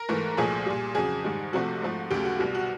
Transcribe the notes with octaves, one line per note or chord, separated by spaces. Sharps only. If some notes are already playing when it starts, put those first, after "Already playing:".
Already playing: A#4
G#2 E3 A3
C2 A#2 F3 A3 G#4
A#2 G3
F2 C#3 F#3 G#4
G#2 D#3 G3
C2 C3 F3 A3 F#4
G#2 F3 A3
D#2 C#3 F#3 A3 G4
F#4
C2 B2 G3
F#4